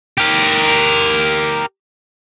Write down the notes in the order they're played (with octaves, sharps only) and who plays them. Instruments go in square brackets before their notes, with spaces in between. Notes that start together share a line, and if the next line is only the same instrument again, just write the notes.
[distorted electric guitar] G4 A#4